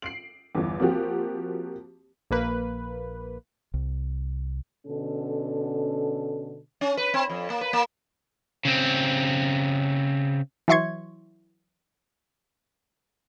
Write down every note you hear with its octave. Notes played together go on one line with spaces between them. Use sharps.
C7 D7 F#7
G1 E2
F3 A#3 C4 F#4 G4
A#1 A#3 B4
C2
B2 D3 C#4 A4
C#4
B4
C4
F2
A#3
B4
A#3
C#3 C4
E3 F#3 E5 C6 C#6 G#6